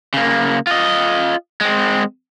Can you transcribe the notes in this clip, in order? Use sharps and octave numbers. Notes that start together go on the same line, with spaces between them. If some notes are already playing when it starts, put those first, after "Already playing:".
C#3 A#3
F4 D#5
G#3 C4